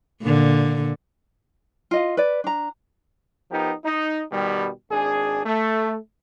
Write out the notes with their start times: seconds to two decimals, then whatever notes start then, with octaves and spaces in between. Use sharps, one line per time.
0.22 A#2 D3
1.91 F4 D#5 F5
2.17 B4 D5
2.44 D4 A#5
3.51 F3 B3 D#4 G4 A#4
3.85 D#4
4.32 B2 D#3 G3
4.90 G#1 D4 G#4
5.45 A3